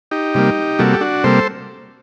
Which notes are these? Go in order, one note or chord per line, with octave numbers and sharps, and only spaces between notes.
D#4 G4
C3 G3 A#3
C3 G3 A#3 F#4 A4
G4
D4 F#4
C3 G3 A#3 A4 C5